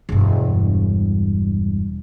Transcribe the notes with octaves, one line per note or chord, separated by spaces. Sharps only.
E1 G2